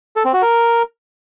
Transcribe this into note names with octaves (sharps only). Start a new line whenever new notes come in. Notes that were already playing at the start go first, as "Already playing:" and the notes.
A4
C4
F#4
A#4